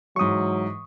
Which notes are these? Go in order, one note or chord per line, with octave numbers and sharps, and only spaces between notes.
G#2 E3 F#3 C#6 D#6